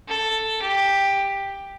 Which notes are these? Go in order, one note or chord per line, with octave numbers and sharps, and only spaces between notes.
A4
G4